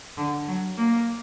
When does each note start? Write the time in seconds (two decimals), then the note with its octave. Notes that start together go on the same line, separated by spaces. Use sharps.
0.17 D3
0.47 F#3
0.77 A#3